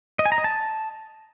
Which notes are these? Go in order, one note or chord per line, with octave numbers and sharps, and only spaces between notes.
D#5
G#5
A#5
D#5
A5